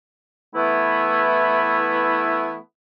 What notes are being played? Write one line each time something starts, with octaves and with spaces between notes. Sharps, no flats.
E3 A3 B3 E4